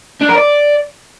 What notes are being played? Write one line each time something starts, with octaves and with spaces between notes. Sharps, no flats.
D4
A#4
D5